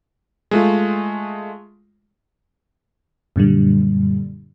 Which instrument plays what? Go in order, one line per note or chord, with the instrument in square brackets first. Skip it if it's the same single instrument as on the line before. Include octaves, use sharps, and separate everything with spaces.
[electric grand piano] G#3 A3 F4
[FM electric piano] F#2 A#2 D3 G3